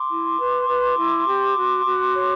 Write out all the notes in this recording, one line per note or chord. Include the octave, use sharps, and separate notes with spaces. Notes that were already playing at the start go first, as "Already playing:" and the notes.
Already playing: C6 D6
E4
B4
B4
E4
G4
F#4
F#4
C#5